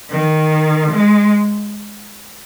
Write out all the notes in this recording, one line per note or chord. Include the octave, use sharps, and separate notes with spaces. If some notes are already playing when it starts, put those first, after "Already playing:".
D#3
G#3